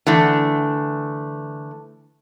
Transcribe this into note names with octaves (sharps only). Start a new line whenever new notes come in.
D3 E3 A3